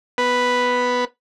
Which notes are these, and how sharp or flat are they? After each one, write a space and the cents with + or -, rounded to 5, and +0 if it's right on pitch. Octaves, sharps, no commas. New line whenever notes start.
B3 +0 B4 +0